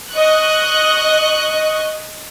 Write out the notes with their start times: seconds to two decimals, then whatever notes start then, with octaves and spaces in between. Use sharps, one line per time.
0.11 D#5 C#6 F#6